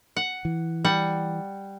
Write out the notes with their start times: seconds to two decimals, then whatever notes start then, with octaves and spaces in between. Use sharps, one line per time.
0.16 F#5
0.45 E3
0.85 G3 F#5